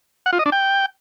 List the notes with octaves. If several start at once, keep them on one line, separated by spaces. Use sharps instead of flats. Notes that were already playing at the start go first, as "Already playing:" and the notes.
F#5
F4
D#5
D4
G5